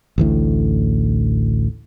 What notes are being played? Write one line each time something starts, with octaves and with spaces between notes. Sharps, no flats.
A1 D2 A2